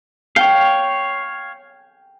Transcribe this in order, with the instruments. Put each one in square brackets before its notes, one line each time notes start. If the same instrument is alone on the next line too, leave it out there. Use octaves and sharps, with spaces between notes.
[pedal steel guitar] C#5 F5 [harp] G5